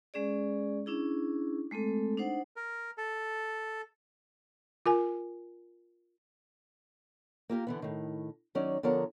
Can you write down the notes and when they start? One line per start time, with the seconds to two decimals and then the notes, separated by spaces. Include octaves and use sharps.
0.14 G#3 C#4 G#4 D5
0.86 C#4 D4 E4 G#4
1.71 G#3 A3 C4 A4
2.18 D4 D#4 C5 F#5
2.56 A#4
2.98 A4
4.86 F4 A#4 G#5
7.50 A#3 F4 G4 A#4
7.67 D3 E3 B3
7.82 A2 D#3
8.55 D#3 F#3 C#4 D#4 D5
8.83 D3 F3 B3 A#4 C#5 A#5